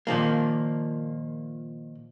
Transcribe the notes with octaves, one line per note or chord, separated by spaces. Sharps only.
A#2 D#3 F3 A#3